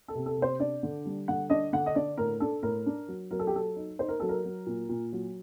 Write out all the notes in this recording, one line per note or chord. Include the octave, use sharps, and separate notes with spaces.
A4
C3
A4
C3
C5
D4 D5
D3
G3
D3 F#5
D4 D#5
D3 F#5
D#5
D4 D5
A2 A#4
D4 A4
A2 A#4
D4
F#3
F#3 A#4
A4
G4
F#3 A4
D#4
D#4 C5
A#4
F#3 A4
A#4
F#3
A#2
A#2
F#3